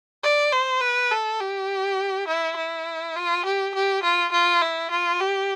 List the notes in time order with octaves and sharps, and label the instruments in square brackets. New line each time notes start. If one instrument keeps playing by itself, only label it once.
[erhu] D5
C5
B4
A4
G4
E4
E4
F4
G4
G4
F4
F4
E4
F4
G4